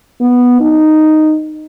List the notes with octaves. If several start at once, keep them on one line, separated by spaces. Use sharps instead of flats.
B3
D#4